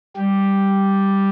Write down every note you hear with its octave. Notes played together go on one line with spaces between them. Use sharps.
G3 G4